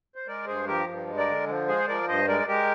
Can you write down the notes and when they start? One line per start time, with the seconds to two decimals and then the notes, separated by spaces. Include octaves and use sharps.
0.16 C5
0.27 G#3 A#4 D5
0.47 G2 G#4 C5
0.67 F3 G4 A#4
0.88 G2
1.07 G#3
1.17 A#4 D5
1.28 D3
1.48 F3
1.68 G#3 G#4 C5
1.88 F3 A#4 D5
2.08 G2 C5 D#5
2.28 G#3 A#4 D5
2.48 G#3 G4 A#4